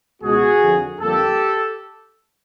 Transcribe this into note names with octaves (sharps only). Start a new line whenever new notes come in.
C#2 B2 G#3 B3 F#4 G#4
F2 D3 F3
F2 D3 G3 A#3 G4 A4